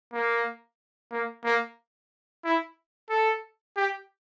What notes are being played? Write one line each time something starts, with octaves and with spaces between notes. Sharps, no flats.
A#3
A#3
A#3
E4
A4
G4